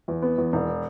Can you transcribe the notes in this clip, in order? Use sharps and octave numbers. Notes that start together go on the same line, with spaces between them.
E2
B3
E2
E1